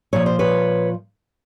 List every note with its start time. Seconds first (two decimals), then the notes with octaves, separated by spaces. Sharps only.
0.13 A#2 F3 C#5
0.26 C5
0.39 B4 C#5